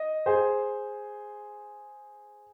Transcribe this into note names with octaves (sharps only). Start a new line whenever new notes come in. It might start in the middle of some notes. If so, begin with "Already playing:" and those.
Already playing: D#5
G#4 C5